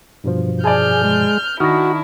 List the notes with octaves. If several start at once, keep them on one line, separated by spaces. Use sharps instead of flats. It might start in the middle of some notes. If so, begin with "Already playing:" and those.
G2 B2 F3
G#4 D5 G#5 A5 F6 G6
G#3
D#3 D4 E4 F#4 C#6 D#6 F6 A#6